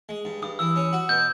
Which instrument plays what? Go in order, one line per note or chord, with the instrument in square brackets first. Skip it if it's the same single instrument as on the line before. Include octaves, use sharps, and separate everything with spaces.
[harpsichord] G#3
G2
[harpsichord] G2 [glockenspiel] D#6
[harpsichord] E3 [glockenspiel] E6
[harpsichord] C#4
F#4
[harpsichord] B2 [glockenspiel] G6